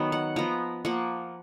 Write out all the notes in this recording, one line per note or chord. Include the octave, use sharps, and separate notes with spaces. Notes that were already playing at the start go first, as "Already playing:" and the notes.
Already playing: D#3 F#3 B3
F#5
F3 B3 A#5
F3 A#3 F#5